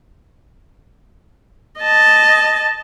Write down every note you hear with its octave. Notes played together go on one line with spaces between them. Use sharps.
D#5 A5